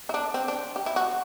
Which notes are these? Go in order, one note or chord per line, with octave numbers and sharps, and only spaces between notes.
E4
D4
C4
D4
G4
E4
F#4